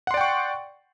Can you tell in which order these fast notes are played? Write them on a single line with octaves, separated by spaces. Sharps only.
F#5 C6 D5 G5 C#6